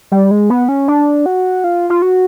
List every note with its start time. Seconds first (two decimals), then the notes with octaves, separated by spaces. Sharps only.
0.12 G3
0.31 G#3
0.50 B3
0.69 C#4
0.88 D4
1.26 F#4
1.64 F4
1.90 F4
2.02 F#4